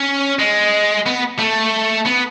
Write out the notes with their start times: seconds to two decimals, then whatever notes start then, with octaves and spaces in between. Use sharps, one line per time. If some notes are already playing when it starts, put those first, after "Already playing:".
Already playing: C#4
0.39 G#3
1.06 B3
1.39 A3
2.06 B3